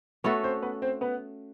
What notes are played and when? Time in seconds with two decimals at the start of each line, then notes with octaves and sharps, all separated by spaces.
0.24 A3 B3 C#4 F#4 A4 B4
0.44 C4 C5
0.63 B3 B4
0.82 C4 C5
1.01 B3 B4